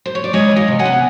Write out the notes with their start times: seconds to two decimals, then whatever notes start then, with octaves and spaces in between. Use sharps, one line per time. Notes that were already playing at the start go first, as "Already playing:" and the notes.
0.06 C5
0.15 C#5
0.24 D5
0.33 G#3 C#5 D#5
0.51 E3
0.56 D#5 F5
0.68 C3
0.79 F#5 G#5
0.85 B3